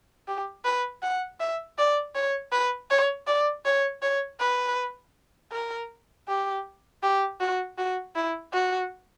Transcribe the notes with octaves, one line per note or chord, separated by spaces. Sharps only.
G4
B4
F#5
E5
D5
C#5
B4
C#5
D5
C#5
C#5
B4
A#4
G4
G4
F#4
F#4
E4
F#4